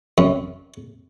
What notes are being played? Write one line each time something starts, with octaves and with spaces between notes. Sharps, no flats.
F#2